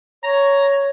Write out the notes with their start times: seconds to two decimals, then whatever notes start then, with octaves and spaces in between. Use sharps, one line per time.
0.23 C#5 A#5